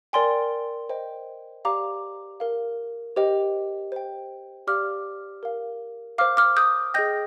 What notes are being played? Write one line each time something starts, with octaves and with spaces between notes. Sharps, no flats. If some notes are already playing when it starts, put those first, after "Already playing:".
A#4 D5 G5 G#5 C6
C5 D#5 G5
G4 D5 F5 A#5 D6
A#4 F5
G4 C5 D#5 G5
C5 G5
G4 D5 F5 D6 F6
A#4 F5
C5 F5 D6 F6
D6 F6
D#6 G6
G#4 D#5 G5 G6 A#6